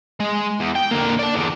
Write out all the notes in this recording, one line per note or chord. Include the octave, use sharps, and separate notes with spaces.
G#3
E2
G5
D3 A#3
D4 D5
E2 D3